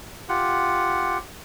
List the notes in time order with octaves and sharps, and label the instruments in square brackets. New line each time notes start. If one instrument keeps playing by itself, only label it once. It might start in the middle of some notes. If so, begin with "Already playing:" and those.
[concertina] F4 G4 F#5